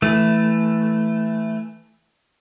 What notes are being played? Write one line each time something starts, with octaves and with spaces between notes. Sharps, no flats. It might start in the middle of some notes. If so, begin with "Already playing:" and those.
E3 A3